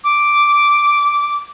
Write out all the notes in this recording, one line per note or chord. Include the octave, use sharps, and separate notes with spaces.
D6